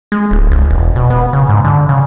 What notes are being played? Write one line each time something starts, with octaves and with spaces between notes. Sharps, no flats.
G#3
D1
C#2
E1
B2
B3
C#3
G#2
D3
C#3